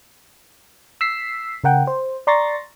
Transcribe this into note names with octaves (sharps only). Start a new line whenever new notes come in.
E6 B6 C7
C#3 A#4 F#5 G5
C5
D5 A#5 C6 C#6 A6 A#6